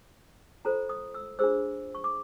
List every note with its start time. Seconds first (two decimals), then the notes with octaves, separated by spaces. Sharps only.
0.65 F4 A4 C5 A#5
0.89 D#6
1.14 E6
1.39 D4 F4 G#4 C5 E6
1.95 C#6
2.04 D6